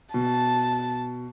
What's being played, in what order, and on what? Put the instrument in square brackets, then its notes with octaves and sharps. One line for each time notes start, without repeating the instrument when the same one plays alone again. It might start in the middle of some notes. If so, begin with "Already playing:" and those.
[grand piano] B2 [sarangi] A5